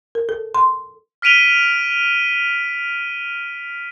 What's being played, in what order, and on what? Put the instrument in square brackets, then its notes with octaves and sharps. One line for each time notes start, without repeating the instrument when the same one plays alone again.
[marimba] A#4
A4
C6
[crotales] F6 B6 D7 D#7 F7 G7